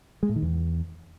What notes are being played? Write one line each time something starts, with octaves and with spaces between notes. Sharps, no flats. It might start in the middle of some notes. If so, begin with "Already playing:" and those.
G#3
A2
D#3
E2